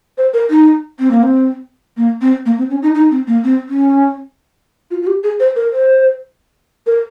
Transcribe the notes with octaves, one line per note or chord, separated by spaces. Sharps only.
C5
A#4
D#4
C4
A#3
C4
A#3
C4
A#3
C4
C#4
D#4
D#4
C4
A#3
C4
C#4
F4
F4
G4
G#4
C5
A#4
C5
A#4